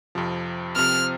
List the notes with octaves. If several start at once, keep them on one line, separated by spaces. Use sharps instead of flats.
F2 C3 F3
C3 F3 C4 F6